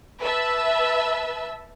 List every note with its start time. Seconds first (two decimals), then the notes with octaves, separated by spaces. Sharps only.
0.22 B4 E5 A5 E6